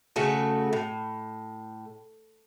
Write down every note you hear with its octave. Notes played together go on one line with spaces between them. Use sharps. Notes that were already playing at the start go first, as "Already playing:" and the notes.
C#3 A3 F#4 A4
A2